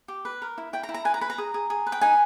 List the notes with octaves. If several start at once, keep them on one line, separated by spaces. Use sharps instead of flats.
G4
B4
A#4
E4
E4 G5
A#5
E4
A#5
B4 G#5
A#5
B4 B5
A#5
G#4
G#4
G#4
B4
G5
D#4 G#5